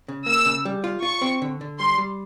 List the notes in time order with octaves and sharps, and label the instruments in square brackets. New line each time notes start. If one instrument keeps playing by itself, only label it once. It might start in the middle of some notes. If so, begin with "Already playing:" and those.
[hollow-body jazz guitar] C#3
[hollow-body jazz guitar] A#3 [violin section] E6
[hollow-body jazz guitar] C#3
G3
F4
[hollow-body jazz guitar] F4 [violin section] C#6
[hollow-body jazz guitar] C4
D3
D3
[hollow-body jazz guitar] G3 [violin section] C6
[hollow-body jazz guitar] G3